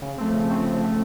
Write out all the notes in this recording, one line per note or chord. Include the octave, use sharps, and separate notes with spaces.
C#3
F3 A3 C4
C#3
F3 A3 C4
C#3
F3 A3 C4